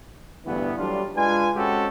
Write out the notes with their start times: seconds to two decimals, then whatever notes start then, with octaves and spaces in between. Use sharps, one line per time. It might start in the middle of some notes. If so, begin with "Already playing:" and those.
0.46 D2 G2 E3 B3
0.77 F#3 G3 A3 D4 F4
1.16 G#3 D4 F4 B4 G#5
1.56 G#3 C4 C#4 F#4 G4 A4